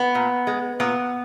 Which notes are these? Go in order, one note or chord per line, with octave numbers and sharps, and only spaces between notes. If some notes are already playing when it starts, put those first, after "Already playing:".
Already playing: B3
A#2
G#3
A#2 B3